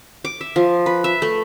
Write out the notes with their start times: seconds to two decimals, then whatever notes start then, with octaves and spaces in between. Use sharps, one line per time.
0.25 D6
0.41 E5
0.56 F3
0.86 B4
1.04 E5
1.22 A3